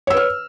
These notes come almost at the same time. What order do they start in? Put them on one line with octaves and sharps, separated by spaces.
C#5 E6 B4 F6